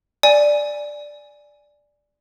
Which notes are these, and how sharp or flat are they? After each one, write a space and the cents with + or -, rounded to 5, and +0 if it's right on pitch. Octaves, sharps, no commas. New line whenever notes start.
D5 +0 G#5 +0